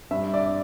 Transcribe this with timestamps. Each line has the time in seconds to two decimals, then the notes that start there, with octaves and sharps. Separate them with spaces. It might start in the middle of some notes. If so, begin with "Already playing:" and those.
0.11 G2 E5
0.34 D5